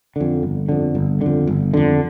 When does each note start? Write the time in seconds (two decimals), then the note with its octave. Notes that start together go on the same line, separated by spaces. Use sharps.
0.16 F2 D3
0.43 G1
0.69 F2 D3
0.95 G1
1.21 F2 D3
1.47 G1
1.74 F2 D3